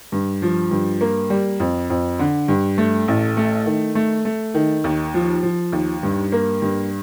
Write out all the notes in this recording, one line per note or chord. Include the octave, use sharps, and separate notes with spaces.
G2
F3
G2
A#3
G3
F2
F2
D3
G2
A3
A1
A3
D#3
A3
A3
D#3
D#2
F3
F3
D#2
G2
A#3
G2